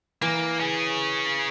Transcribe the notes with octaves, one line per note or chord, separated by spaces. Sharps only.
E3 A#3
C#4 G#4